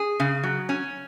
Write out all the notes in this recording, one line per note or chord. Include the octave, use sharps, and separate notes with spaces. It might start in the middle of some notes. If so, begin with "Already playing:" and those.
Already playing: G#4
C#3
F#3
C#4